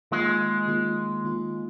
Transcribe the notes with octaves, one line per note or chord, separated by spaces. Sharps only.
D#3 G#3 A#3 F4
D#3 A#3 F4
D#3 A#3 F4